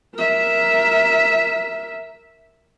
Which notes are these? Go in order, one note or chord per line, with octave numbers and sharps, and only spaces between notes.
A#4 E5